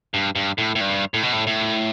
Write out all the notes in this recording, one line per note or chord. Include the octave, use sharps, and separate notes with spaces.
G2
G2
A2
A2
G2
A2
B2
A2
A2